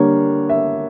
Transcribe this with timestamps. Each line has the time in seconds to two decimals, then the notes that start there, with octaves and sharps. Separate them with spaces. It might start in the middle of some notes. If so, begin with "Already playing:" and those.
Already playing: D3 G3 A#3 C#5
0.49 E5